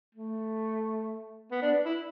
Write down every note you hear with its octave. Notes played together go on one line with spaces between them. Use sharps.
A3
B3
D4
E4